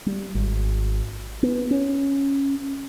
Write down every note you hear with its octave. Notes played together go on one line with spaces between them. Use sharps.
G3
G#1
B3
C#4